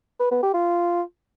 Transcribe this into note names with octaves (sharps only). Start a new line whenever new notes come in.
B4
B3
G4
F4